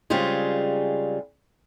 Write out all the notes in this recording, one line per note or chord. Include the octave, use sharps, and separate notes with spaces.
C#3 G3 G#3 C4 F4 G#4